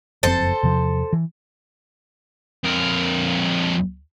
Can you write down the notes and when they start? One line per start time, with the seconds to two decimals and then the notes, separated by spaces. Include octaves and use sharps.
0.23 F#1 F2 C4 A4 C5
0.63 E2 C3 F3
1.13 E3
2.64 F2 A#4